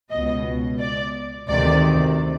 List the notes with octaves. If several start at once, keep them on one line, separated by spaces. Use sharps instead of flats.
C#2 B2 D#5
D5
D2 C3 D#3 D5